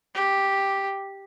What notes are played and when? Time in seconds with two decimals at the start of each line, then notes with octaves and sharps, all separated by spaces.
0.15 G4